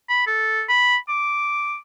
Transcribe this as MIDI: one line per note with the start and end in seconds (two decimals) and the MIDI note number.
0.09 0.24 83
0.27 0.62 69
0.69 0.96 83
1.09 1.77 86